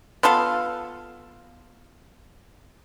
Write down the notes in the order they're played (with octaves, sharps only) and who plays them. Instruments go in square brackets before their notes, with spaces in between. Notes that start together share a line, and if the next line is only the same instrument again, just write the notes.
[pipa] B3 F4 A4 F5